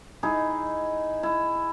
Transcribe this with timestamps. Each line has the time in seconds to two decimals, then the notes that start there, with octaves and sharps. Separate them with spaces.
0.23 D#4 E4 G#4
1.23 E4